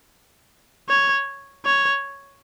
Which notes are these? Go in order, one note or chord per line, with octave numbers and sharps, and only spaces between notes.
C#5
C#5